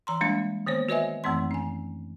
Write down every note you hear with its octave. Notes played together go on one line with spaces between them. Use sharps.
E3 A#5 C6
G3 G#3 A#3 D4
D#3 A#3 B3 C5 C#5
F#4 B4 C#5 D#5 E5 G#5
F#2 E3 A3 C4 C6
C#4 G#5